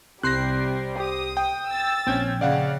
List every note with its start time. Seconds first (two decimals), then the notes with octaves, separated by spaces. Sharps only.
0.23 C2 C3 G3 C5 F#6 A#6 C7
1.00 G4 D#6
1.37 G5
1.69 E6 A6
2.07 A#1 C4 C#4 G5 G#6
2.41 C#3 D5 F5 F#5